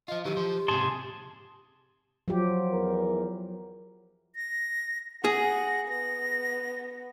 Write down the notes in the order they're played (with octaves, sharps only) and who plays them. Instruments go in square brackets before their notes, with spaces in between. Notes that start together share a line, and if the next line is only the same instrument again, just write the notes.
[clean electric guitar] F3 F4 [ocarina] D#5
[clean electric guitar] D#3 E3 F#3 [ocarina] G4
[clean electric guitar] F3 C5
[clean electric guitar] C#2 G#2 C3 [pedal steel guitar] G#4 A5 C6
[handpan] F3 F#3 G4
[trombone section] E2 A#4
[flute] A#6
[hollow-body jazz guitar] G#4 [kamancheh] F#5 [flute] A#6
[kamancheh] B3 [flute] A#6